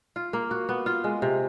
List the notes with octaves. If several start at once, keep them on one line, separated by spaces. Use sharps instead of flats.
F4
A#3
F#4
B3
F4
G#3
C3